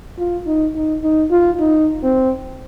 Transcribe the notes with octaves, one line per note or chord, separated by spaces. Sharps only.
F4
D#4
D#4
D#4
F4
D#4
C4